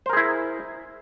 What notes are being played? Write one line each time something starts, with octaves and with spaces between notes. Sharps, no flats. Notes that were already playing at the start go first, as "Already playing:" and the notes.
E4 G#4 A#4 C5